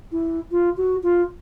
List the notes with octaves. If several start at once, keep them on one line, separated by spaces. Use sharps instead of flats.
E4
F4
F#4
F4